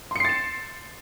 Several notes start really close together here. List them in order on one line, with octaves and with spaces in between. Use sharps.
C6 C#7 C7 A6 E7